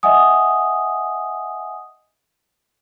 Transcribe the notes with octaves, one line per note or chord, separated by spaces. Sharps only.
D#5 E5 F#5 G#5 D#6